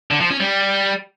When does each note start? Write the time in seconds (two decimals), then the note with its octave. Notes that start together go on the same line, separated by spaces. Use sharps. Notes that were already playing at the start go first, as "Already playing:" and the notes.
0.11 D3
0.21 F3
0.30 C#4
0.40 G3